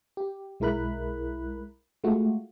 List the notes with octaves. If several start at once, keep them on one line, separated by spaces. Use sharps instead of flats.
G4
B1 G#3 E4 A#4 B5 F#6
G#3 A3 F4 F#4